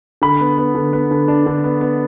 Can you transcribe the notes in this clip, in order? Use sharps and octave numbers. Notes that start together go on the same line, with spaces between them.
D3 B5
B3
B3
D3
B3
D3
D4
D3
B3
B3